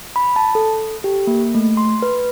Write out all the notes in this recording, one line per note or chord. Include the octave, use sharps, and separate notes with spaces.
B5
A5
A4
G4
A#3
A3
C6
B4